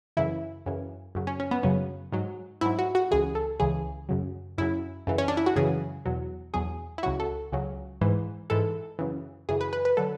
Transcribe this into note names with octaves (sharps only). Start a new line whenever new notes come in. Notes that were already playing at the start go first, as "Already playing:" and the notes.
F#2 C#3 E3 E4
F#2 C#3 E3
F#2 C#3 F#3
C#4
C#4
B3
F#2 C#3 F#3 C#4
G#2 F#3
G#2 F#3 E4
F#4
F#4
C#2 C#3 E3 G#4
A4
C#2 C#3 E3 G#4
F#2 C#3 F#3
F#2 C#3 F#3 E4
F#2 C#3 E3
C#4
D4
E4
F#4
F#2 C#3 E3 G#4
E2 B2 F#3
E2 B2 F#3 G#4
E4
C#2 C#3 F#3 F#4
A4
C#2 C#3 F#3
G#2 E3
G#2 E3 A4
F#2 C#3 E3
F#2 C#3 E3 G#4
B4
B4
B4
D3 F#3 A4